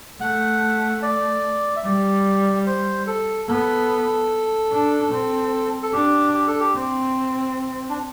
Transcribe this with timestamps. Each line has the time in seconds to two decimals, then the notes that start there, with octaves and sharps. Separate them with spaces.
0.21 A3 F#5
1.02 D5
1.76 E5
1.85 G3 D5
2.66 C5
3.07 A4
3.48 B3 A4
4.71 D4
5.12 C4
5.83 A4
5.93 D4 G4
6.34 G4
6.47 A4
6.60 G4
6.75 C4
7.89 D4